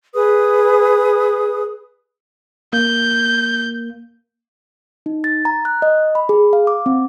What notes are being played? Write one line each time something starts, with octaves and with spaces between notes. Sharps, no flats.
G#4 B4 D#6
A#3 G6
D#4
A6
A#5
F#6
D#5
B5
G#4
F5
D6
C4